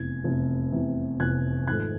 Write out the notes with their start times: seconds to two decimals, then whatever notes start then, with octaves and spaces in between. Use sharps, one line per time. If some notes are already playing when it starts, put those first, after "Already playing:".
Already playing: F1 E2 C3 G#6
0.24 F1 E2 C3
0.72 F1 E2 C3
1.20 F1 E2 C3 F#6 G#6
1.67 G#1 G#2 F3 A3 F#6 G#6